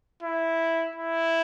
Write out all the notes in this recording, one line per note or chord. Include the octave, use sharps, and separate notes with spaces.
E4
E4